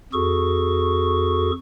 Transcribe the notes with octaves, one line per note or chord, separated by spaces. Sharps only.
F2 F#4 G#4 A4 C#6